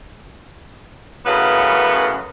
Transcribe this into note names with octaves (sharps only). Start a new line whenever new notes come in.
F#2 A2 C#3 B3 B4